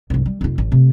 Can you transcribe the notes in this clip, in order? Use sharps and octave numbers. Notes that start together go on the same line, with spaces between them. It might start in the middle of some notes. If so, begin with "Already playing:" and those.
C2 G2
G3
F1 F4
A1
C3 A3